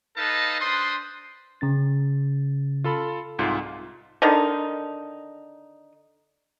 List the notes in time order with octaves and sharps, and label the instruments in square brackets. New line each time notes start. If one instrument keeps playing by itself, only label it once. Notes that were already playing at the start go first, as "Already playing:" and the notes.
[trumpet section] D#4 A4 B4 D#5 F5 A5
D4 B4 C5 C6 D#6
[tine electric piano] C#3 C#4 A6
[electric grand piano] F4 A4 B5
C2 G#2 F4
[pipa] D3 D#3 D#4